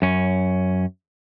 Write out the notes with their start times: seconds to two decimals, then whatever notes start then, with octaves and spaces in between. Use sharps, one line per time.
0.02 F#2 C#4